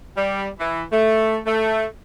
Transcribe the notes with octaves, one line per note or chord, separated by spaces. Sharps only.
G3
E3
A3
A3